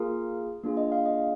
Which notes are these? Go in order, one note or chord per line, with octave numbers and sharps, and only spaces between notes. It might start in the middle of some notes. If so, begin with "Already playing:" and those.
Already playing: A#3 F4 G#4 A#4
A#3 D4 F4 G#4
D#5
F5
D#5